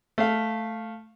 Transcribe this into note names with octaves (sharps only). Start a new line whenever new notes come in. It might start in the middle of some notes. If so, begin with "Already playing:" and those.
A3 F5